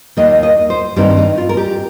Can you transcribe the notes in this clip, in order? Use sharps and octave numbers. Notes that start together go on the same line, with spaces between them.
D#2 D#3 A#3 D#5
D#5
C5
G2 D#3 C4 D#4 G4
D#4
F4
A#4
G4